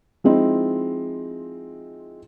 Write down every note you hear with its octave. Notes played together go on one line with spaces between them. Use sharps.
F3 G#3 C4 D#4 E4